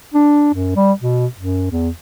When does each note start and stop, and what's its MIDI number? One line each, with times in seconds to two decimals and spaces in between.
0.14 0.52 62
0.54 0.73 42
0.76 0.93 55
1.01 1.27 47
1.37 1.71 42
1.71 1.90 40